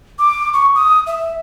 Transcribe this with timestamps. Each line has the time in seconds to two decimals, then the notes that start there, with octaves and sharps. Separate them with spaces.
0.19 D6
0.53 C#6
0.75 D#6
1.07 E5